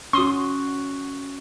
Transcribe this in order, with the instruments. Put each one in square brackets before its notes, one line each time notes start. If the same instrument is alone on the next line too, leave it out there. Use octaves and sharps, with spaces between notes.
[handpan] C#4 F#4 [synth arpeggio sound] C6 D#6